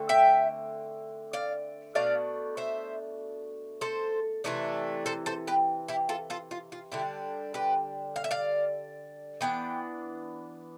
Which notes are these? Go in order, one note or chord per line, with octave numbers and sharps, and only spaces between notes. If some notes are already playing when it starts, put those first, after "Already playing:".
Already playing: D3 A3 C4
E5 G5
D5 F5
B2 A3 D4 D5 F5
C5 E5
A4 C5
C3 E3 A3 D4
A4 C5
A4 C5
G4 B4
E4 G4
F4 A4
F4 A4
F4
F4
D3 G3 D4 E4 G4
G4 B4
F5
E5
D5 F5
E3 B3 D4 G5